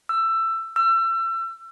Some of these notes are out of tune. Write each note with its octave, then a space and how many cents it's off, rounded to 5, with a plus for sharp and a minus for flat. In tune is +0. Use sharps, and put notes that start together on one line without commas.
E6 +20
E6 +35